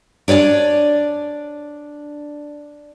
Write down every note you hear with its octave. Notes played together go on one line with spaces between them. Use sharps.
D4 C#5 D5 G#5